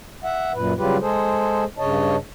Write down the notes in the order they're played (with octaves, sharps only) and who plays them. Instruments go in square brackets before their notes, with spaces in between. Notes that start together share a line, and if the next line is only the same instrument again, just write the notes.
[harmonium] E5 F#5
F#2 A#2 B4
C#3 F#3 G3 F4 G4 B4
G#3 G#4 A4 C5
G2 C#3 C#5 D#5 A5